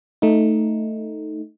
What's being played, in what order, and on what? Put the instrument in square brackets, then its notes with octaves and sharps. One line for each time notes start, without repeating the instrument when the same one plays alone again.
[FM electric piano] A3 D#4